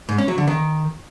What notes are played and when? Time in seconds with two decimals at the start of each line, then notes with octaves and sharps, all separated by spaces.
0.09 G#2
0.18 C#4
0.28 F#3
0.38 D3
0.47 D#3